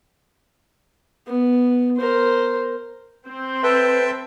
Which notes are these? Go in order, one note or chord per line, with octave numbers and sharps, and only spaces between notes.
B3
A#4 C5
C4 C5
A4 B4 E5 G5